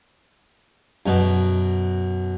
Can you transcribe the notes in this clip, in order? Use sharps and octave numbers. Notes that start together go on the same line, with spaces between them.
F#2 B2